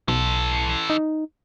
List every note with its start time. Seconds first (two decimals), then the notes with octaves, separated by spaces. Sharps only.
0.08 B1 E3 A4
0.90 D#4